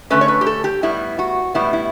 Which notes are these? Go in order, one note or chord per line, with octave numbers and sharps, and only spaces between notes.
D3 A3 C#4 B4
C#5
B4
G4
A4
G4
A2 G3 B3 E4
F#4
A2 G3 B3 E4
E4